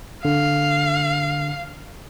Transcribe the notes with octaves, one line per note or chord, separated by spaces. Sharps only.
D3 F5